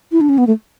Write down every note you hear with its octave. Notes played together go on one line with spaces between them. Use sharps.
E4
D4
C#4
B3
A3